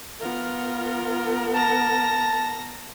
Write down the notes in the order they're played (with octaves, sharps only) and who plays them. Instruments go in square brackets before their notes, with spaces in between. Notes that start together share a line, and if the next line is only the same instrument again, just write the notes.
[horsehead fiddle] B3 A#4 [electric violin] F4
[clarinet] A5 [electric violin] A#5 A#6